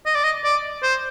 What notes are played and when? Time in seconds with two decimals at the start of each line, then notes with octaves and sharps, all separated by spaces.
0.06 D#5
0.15 D5
0.24 D#5
0.44 D5
0.83 C5